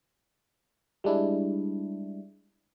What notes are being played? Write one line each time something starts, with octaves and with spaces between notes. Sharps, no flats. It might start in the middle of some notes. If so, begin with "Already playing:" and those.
G3 G#3 D4 E4